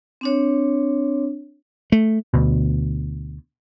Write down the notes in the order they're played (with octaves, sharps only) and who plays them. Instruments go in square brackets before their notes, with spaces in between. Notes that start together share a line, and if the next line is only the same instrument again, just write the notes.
[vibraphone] C4 D4 C#5
[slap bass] A3
[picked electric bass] D2 B2